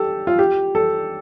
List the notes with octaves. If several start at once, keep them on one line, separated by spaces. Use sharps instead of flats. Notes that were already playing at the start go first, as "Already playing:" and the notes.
Already playing: G4 A4
F4
G4
A4